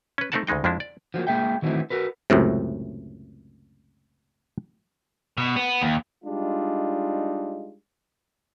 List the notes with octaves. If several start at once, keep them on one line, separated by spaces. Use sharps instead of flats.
C#4 B4
A3 C4 D#4 A#4 F#5 A5
D2 C#3 G#3 D#4 G5
F2 F3 G#3 D4 E4
D5
F3 F#3 G#3 A#3
G#3 A#3 G#4 E5 G5
D#3 E3 F#3 A3 C4 E4
F#4 A#4 B4
C#2 F#2 A2 C3
B2
B3
D#2
G3 G#3 D4 D#4 F4